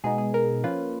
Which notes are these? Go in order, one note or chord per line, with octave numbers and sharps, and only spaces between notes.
B2 G#3 B3 D#4 G#4
G#4
A#4
F3 A#3 C#4 F4 B4